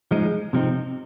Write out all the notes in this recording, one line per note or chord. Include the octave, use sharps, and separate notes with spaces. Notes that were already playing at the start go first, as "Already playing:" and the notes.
F3 G#3 D#4
C3 F3 C4 D#4